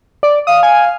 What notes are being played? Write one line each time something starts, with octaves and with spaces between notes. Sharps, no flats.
D5
F5 D#6
G#5